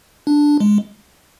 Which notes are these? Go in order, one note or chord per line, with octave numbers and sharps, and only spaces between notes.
D4
G#3